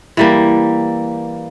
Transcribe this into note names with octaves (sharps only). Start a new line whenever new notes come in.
E3 G3 A#3